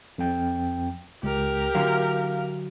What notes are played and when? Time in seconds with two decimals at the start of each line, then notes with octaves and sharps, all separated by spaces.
0.18 F2 G5
1.23 C#2 G4 A#4
1.75 D3 F#3 F5